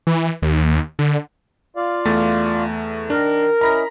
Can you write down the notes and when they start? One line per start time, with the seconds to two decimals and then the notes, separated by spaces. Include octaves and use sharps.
0.07 E3
0.42 D#2
0.99 D3
1.76 F4 D5 F5
2.05 E2 A3 A6
3.10 D#3 D4 A#4
3.61 C#4 E4 D#5 A#5 B5 A#6